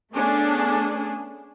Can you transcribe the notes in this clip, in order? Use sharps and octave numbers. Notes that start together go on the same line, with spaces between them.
A3 B3 C#4 D4 G#4 A4